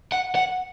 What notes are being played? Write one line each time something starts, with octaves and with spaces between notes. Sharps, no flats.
F#5
F#5